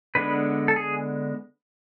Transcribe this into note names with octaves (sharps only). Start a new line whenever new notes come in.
D3 G#3 B3 D4 B4
A4
G#4